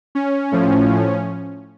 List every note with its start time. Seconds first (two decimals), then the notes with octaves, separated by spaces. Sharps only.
0.15 C#4
0.52 A2 F3